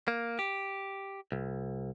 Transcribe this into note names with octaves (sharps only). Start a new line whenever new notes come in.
A#3
G4
C2